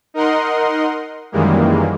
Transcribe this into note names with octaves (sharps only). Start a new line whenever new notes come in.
D#4 A#4 D#5 F#5 C6
F#2 D#3 E3 G3 G#3 A#3